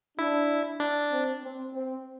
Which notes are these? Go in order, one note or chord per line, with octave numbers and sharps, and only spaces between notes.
D4 E4
D4
C4
C4
C4